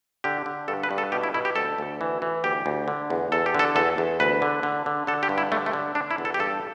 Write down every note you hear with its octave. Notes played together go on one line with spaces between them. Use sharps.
D3 G4
D3
G2 A4
B4
G2
A4
B2 G4
E4
B2 E4
G4
D2 A4
D2
E3
E3
D2 G4
D2
D3
E2
E2 A4
G4
D3 A4
E2 A4
E2
D2 B4
D3
D3
D3
D3 A4
G4
G2
E4
D3 A3
A3
D3
D3 D4
E4
E2
A4
G4
G2 A4